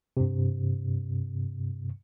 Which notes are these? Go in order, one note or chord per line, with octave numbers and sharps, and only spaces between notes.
G2 C3